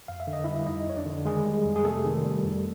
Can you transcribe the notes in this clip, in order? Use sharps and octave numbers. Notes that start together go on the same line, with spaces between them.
F2 F5
E5
D3
D#5
G3 E4 E5
F2 D#4 D#5
F2 C#5
D4 D5
D3
D#3 G#3 G#4
G3
F2
G#4
C3 A3 A4
D#3
G3
F2